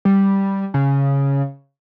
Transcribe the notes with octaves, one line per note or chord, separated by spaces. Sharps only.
G3
C#3